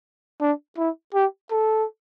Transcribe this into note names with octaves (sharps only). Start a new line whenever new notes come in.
D4
E4
G4
A4